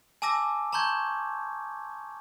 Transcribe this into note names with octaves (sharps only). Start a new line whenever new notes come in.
G#5 A5 D6 E6 A#6
A5 A#5 C6 C#6 G6 G#6